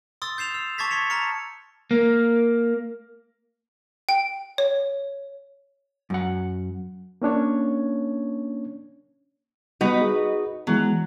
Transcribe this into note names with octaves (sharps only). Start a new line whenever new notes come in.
C6 D#6 E6 A6
G6 C7 E7 F7
E6
A5 C#6 D6 G#6 A6 B6
C6 B6 C#7 F7
A5 A#5 F6 C#7
A#3
G5
C#5
F#2 F#5
A#3 C#4 D4 C#5
G3 B3 D#4 F#4 B4
G#4 D#5
E3 F#3 G#3 B3